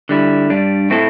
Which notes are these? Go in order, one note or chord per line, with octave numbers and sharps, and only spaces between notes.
D3 G3 E4
G2 G3 D4
A2 A3 C4 E4 A4